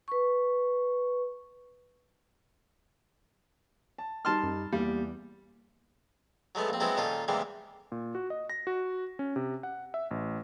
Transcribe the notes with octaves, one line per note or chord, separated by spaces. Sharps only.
B4 C#6
A5
G3 D#4 A5 C6 F6
F#2
E2 G3 A#3
F#3 G#3 A3 B3
A#1 C4
F#3 G#3 B3 C4 E4 F#4
A#2 D#3 C#4 D#4 A4
E2 C3 E3 G3 G#3 A#3
A#2
F#4
D#5
A#6
F#4
C#4
C3
F#5
E5
A1